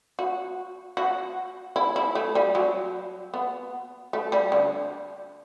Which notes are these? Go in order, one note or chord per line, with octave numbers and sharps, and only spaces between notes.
F#4
F#4
E4
E4
A3
G3
F#3
B3
A3
G3
D3